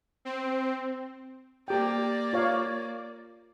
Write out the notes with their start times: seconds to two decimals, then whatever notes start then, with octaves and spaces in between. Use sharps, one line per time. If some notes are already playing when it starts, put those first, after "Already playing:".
0.25 C4
1.68 A#3 G4 D5 G5
2.33 F4 C#5 F5